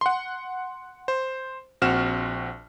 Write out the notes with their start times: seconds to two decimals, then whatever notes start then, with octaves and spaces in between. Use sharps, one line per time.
0.01 F#5 C6
1.08 C5
1.82 A#1 C4 F#4 F6 E7